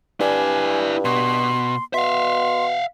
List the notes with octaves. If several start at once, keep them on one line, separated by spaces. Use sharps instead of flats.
G2 E4 D5 G#5
B2 C6
B2 E5 F5 C6